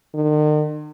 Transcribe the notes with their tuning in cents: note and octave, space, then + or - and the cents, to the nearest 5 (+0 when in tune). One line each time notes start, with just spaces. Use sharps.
D#3 -45